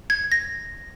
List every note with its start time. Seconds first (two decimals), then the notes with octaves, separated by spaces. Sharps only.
0.10 G#6
0.32 A#6